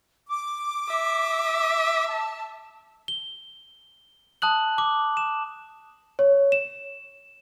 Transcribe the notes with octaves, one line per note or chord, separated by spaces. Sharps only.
D6
E5
A5
G7
A5 D#6 F#6 F#7
D6
E7
C#5
E7